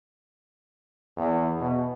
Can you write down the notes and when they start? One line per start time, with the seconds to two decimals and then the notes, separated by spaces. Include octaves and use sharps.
1.17 E2
1.60 B2